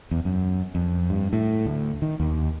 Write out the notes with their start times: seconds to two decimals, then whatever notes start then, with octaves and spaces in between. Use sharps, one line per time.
0.11 E2
0.25 F#2
0.75 F2
1.10 G2
1.33 A2
1.66 D2
2.02 D#3
2.20 D#2